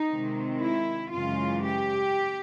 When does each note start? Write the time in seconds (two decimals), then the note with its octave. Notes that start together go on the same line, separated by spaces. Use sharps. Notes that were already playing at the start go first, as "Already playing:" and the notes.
Already playing: D#4
0.08 C3 D#3 G#3 C4
0.60 E4
1.11 F#2 C#3 E3 G#3 F4
1.63 G4